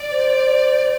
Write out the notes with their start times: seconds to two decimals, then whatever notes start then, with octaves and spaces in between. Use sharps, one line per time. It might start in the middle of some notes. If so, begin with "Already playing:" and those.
Already playing: D5
0.10 C5